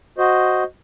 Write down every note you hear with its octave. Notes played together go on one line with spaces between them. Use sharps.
F#4 C5 D#5